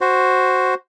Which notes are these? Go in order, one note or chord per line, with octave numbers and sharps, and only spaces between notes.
F#4 C5